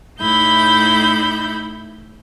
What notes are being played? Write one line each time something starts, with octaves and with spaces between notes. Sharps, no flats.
A2 D#4 E4 B5 G6